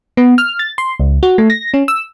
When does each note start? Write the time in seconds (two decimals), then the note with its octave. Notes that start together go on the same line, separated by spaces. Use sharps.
0.17 B3
0.38 F6
0.59 A6
0.78 C6
1.00 C#2
1.23 F#4
1.38 A3
1.50 A#6
1.74 C#4
1.88 E6